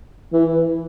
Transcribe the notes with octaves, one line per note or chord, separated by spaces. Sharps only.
E3